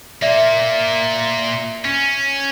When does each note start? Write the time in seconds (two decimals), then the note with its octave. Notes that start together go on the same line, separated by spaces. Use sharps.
0.22 A#2 A#3 D5 E5
1.85 C#4